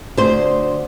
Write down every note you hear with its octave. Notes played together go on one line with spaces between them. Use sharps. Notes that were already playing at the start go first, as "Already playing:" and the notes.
D2 C5